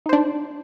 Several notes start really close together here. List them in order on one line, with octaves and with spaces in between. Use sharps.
D#4 C5 D4